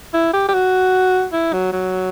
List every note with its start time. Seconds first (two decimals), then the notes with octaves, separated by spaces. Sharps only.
0.14 E4
0.33 G4
0.49 G4
0.54 F#4
1.33 E4
1.53 F#3
1.73 F#3